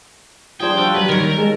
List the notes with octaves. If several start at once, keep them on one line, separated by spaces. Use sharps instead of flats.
F3 G3 D4 G#4 C5 G5
F4 F#4 A4
F#3 G3 B4
D#3 A#4 C#5
D#2
G#3 A5